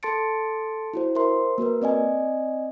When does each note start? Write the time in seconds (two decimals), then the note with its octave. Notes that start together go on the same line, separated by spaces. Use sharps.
0.03 A4 A5 C6 A6 C#7 D7
0.94 E4 F#4 C5
1.15 A#4 C5 E5 C6
1.58 A#3 F#4 A#4 B4
1.82 C4 D5 D#5 G#5